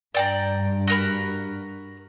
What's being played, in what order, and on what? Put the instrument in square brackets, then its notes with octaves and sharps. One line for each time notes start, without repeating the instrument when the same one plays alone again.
[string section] G2 [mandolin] D5 G5 A#5
[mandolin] F#4 A#4 B5